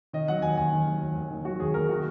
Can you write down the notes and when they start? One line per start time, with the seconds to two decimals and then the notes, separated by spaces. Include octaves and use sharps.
0.13 D#3 D#5
0.28 F#3 F#5
0.42 D#2 G#5
0.57 D#2 G#5
0.72 D#3
0.87 F#3
1.02 D#2
1.16 D#2
1.31 D#3
1.45 F#3 F#4
1.60 D#2 G#4
1.74 D#2 A#4
1.89 D#3 F#4